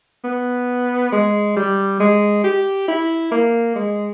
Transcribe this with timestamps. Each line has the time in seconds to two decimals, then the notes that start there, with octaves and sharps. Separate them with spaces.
0.24 B3
1.12 G#3
1.56 G3
2.00 G#3
2.44 G4
2.88 E4
3.31 A#3
3.75 G#3